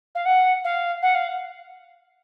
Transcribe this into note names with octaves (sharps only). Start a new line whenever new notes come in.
F5
F#5
F5
F#5
F5